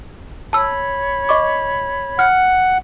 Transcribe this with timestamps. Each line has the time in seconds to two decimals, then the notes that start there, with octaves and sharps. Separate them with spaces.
0.53 C#5 A5 B5 E6
1.29 D#5 C#6 D6
2.19 F#5 F6